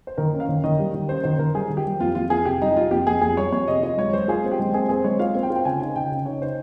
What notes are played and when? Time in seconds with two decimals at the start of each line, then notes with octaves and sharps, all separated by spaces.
0.07 C5
0.18 D#3 A#4
0.33 C#4
0.40 F5
0.49 D#3
0.64 D#3 D#5
0.79 G3
0.94 D#3
1.09 C#4 C5
1.24 D#3 C5
1.39 D#3 A#4
1.54 G3 G#4
1.70 D#3
1.77 G4
1.86 G3
2.00 F2 F4
2.15 F2 F4
2.30 F2 G#4
2.45 C3 G4
2.61 G3 D#4
2.77 C3 F4
2.91 F2 G4
3.07 F2 G#4
3.22 F2 G#4
3.37 G3 C#5
3.52 F2 C#5
3.68 C3 D#5
3.83 F4 D#5
3.97 G#3 C#5
4.13 G#3 C5
4.28 F4 G#4
4.44 C4
4.52 G4
4.59 G#3
4.74 C4 G#4
4.89 C4 G#4
5.04 G#3 C#5
5.19 F4 F5
5.35 C4
5.43 G5
5.50 F4
5.56 G5
5.65 C#3 G#5
5.80 D#4 G#5
5.96 C#3 G5
6.12 C#3
6.26 D#4 C#5
6.41 D#4 C5